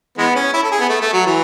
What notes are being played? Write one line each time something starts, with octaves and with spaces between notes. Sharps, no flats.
E3 G#3 B3
C#4
E4
A4
G#4
B3
A3
A3
F#3
E3